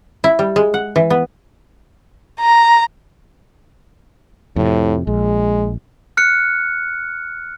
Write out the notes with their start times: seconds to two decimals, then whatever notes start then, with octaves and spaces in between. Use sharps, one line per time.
0.24 E4
0.39 G3
0.56 G#3
0.74 F#5
0.96 E3
1.10 B3
2.40 A#5
4.56 F2 A2 C3
5.07 A#1 G#3
6.17 F6 F#6 C#7